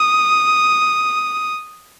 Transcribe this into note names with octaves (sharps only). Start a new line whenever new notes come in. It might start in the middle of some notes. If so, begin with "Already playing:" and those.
Already playing: D#6